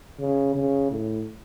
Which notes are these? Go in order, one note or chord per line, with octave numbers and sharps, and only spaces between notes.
C#3
C#3
A2